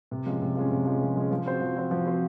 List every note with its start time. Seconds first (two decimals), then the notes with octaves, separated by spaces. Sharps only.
0.11 C3
0.26 F3 G#3 C#4
0.41 C3
0.56 F3 G#3 C#4
0.71 C3
0.85 F3 G#3 C#4
1.01 C3
1.16 F3 G#3 C#4
1.31 F3
1.46 C4 F#4 C5
1.61 F3
1.76 C4 F#4 C5
1.91 F3
2.06 C4 F#4 C5